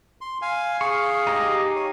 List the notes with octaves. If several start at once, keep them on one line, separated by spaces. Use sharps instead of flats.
C6
F5 G#5
G#4 F5 C#6
D#4 G4 D#5
C#5